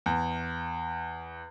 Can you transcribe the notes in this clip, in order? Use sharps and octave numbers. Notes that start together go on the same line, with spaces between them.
E2